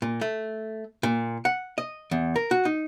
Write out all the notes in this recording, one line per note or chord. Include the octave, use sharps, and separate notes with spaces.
A#2
A3
A#2
F#5
D#5
E2
A#4
F#4
D#4